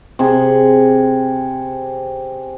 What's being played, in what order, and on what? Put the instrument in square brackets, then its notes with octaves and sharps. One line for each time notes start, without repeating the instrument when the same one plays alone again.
[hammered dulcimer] C3 G#4